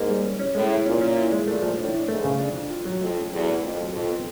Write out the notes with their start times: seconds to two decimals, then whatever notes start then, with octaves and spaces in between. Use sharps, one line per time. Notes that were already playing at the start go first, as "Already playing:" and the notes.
Already playing: G#2 A#3
0.09 G3
0.24 C#4
0.39 C#4
0.55 A2 G#3
0.70 E4
0.86 A#2 C#4
1.01 C#4
1.17 E4
1.32 G#3
1.47 A#2 A3
1.62 F3
1.78 A2 D4
1.94 D4
2.08 G#2 A3
2.24 C#3
2.39 F2 D4
2.55 D4
2.70 F4
2.85 F#3
3.01 F2 A3
3.16 C#4
3.32 E2 F#3
3.47 A3
3.62 F2 A3
3.78 F#3
3.93 F2 A4
4.08 B3